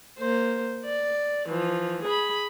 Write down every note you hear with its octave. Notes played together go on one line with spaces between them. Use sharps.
A#3 C5
D5
E3 F3
G#4 B5